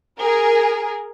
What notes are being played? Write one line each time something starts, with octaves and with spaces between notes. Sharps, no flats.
G#4 A#4